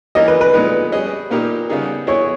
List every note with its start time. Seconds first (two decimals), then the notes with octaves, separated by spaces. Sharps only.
0.15 E3 A#3 C#4 G4 A#4 D#5
0.28 B4
0.41 B4
0.53 A#2 G#3 B3 D#4 B4
0.92 G3 C#4 G#4 D#5
1.31 A#2 A#3 D#4 G4 A#4
1.69 C#3 G3 B3 D#4 G#4
2.07 B3 E4 G#4 C#5 D#5